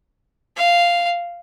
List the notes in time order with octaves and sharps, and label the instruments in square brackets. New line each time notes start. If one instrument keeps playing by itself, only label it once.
[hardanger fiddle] F5